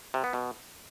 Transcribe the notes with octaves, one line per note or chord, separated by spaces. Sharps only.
C3
B3
B2